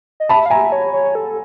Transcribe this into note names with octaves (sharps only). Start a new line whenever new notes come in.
D#5
E5 A5 B5
F5
E5 G#5 A#5
C#5
C#5
A4